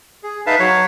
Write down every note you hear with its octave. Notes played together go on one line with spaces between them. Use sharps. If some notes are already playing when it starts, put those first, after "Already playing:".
G#4
D#4 B4 E5 F5 A5
F#3 C#5